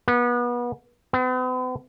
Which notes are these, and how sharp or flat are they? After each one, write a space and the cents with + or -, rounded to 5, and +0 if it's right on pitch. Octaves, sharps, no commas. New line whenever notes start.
B3 -30
B3 +45